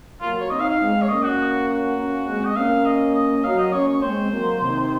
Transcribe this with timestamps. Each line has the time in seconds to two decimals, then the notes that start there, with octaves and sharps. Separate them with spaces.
0.21 F#3 A#3 F4
0.40 C#5
0.50 C4 D#4 D#5
0.60 F5
0.70 F5
0.80 G#3 C4
1.02 C#5
1.09 A#3 C#4 D#5
1.24 F#4
1.67 F#4
1.96 A#3 C#4
2.27 G#3 C4
2.45 D#5
2.55 A#3 C#4 F5
2.85 D#5
3.14 D#5
3.43 F#3 A#3 F5
3.58 D#5
3.73 A#3 C#4 C#5
3.88 C#5
4.02 G#3 C4 C5
4.31 F#3 A#3
4.60 C3 D#3